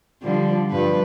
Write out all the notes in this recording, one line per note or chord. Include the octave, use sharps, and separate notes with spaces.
D3 F3 G3
G2 F3 B4